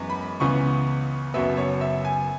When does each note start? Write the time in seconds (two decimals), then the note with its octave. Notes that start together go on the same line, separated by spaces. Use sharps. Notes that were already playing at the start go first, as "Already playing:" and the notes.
Already playing: F#2 E3 G#3 B3
0.10 B5
0.40 C#2 C#3 E3 B3 C#6
1.34 F#1 F#2 F#3 B3 E5
1.57 C#5
1.81 E5
2.05 G#5